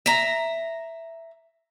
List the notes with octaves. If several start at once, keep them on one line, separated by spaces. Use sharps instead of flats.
E5 A#5